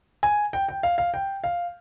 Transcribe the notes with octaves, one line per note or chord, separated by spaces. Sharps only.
G#5
G5
G5
F5
F5
G5
F5